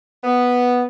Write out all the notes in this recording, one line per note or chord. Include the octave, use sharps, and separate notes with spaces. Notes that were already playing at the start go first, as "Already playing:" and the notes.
B3